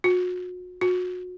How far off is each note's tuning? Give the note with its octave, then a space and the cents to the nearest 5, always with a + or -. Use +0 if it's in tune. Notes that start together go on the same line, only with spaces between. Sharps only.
F#4 -35
F#4 -30